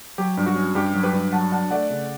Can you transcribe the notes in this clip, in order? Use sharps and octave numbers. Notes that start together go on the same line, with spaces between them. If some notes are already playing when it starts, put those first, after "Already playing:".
F#3 G4
G2
F#4
C#4
G2 G4
F#3
G4 B4
G2
F#3 F#5 A5
D4 F#5 A5
A3 D5 F#5
C#3